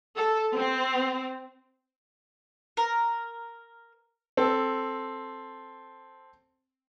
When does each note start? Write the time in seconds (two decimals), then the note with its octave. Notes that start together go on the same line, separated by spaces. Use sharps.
0.17 A4
0.54 C4
2.77 A#4
4.37 C4 A4